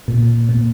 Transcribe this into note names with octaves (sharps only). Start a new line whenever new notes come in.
A#2
A#2